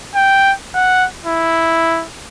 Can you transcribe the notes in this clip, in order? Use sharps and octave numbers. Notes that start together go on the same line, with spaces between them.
G5
F#5
E4